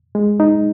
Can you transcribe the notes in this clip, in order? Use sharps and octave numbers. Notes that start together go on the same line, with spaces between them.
G#3
D#4